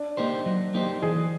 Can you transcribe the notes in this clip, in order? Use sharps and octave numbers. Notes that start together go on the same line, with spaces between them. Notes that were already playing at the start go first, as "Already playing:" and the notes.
Already playing: D4
A#3 D#4 G4 C5
F#3
A#3 D#4 G4 C5
E3 G#4